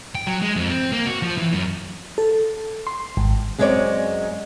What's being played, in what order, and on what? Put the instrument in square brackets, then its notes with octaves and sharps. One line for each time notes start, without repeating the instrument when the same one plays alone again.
[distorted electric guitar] G5
F#3
G#3
F2
C4
A#3
F#4
F3
E3
F#2
[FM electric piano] A4
C6
G#1
[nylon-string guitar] F#2 G#3 C4 E4 C#5 D5